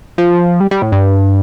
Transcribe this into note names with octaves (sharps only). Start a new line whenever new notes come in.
F3
G3
G3
A2
G2